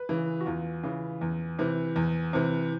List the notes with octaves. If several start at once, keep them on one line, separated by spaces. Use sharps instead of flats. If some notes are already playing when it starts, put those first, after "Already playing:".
Already playing: B4
C#3 E3
F#4
E2 F4
C#3 E3
E2
C3 E3
E2
C3 E3